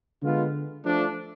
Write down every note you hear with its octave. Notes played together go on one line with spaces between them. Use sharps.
D3 G#3 B3 F4
F3 A3 D4